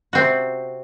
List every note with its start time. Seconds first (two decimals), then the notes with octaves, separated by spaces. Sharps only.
0.13 C3 C4 F#4